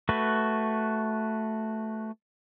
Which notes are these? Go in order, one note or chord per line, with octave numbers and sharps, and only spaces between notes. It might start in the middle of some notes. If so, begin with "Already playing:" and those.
A3 F#4 B4